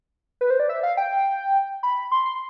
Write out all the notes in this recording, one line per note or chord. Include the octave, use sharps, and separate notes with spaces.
B4
C5
D5
E5
F5
G5
B5
C6
C6